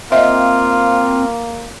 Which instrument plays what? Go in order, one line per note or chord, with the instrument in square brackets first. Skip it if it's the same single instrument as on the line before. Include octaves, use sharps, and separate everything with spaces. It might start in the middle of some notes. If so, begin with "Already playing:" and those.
[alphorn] A#3 [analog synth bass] C4 [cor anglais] F4 [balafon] D#5 E5